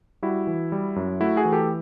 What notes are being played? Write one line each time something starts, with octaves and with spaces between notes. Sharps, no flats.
G3 E4 F#4
E3
G3
F#2
A3 E4 F#4
F#4 G#4
E3
G4 A4